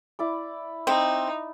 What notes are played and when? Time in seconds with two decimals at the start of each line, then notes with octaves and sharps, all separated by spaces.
0.19 E4 D5 D6
0.87 C4 D#4